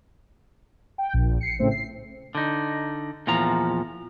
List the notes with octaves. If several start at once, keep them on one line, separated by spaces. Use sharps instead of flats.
G5
A#1
C7 C#7
A2 C#3 A3 C4
C7
D3 D#4
E2 A#2 F3 A#5